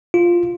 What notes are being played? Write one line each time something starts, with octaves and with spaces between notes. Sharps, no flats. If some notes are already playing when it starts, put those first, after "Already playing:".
F4